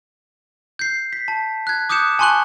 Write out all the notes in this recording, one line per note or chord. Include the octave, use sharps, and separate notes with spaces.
G6 C7
B6
A5
F#6 G#6
D6 D#6 F#6 G6 C#7 E7
G#5 A5 C6 C#6 F#6 F#7